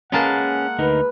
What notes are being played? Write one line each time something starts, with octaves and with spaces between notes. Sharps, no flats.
G#3 A#3 C#4 G#4 B4 F#5 A5
D2 D#4 A#4 B4